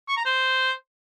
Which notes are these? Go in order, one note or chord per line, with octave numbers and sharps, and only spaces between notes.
C#6
A#5
C5